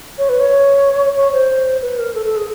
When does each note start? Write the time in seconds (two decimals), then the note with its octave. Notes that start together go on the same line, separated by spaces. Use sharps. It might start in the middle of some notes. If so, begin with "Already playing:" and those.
0.18 C#5
0.29 B4
0.40 C#5
1.16 C#5
1.33 C5
1.82 B4
1.99 A#4
2.14 A4
2.25 A4
2.36 G#4